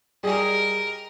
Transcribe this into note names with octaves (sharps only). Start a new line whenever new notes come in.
G3 G#4 A#4 D#5